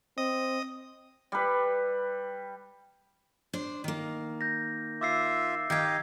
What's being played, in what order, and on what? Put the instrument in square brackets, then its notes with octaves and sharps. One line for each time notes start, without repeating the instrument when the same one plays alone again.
[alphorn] C4 [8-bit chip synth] D#5 D#6
[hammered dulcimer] G3 B4
[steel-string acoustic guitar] D4 C5
D#3 A#3
[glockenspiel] G6 A#6
[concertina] F4 E5 [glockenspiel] D6 E6 C7
[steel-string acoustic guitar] D#3 G5 [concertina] G4 D#5 F5 [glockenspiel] G6 G#6